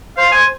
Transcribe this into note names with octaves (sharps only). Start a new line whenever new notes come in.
C5 F5
C5 G#5